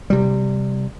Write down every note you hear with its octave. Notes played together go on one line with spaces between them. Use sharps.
C3 G3